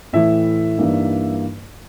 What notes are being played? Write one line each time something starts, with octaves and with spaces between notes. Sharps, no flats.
A2 E3 A3 E5
G2 E3 G3 A#3 D#4